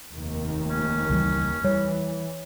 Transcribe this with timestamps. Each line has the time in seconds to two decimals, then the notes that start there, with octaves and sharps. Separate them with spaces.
0.13 F1 D#2 D#3
0.69 C#4
1.10 C#2 E3 G3
1.64 E3 G3 C#5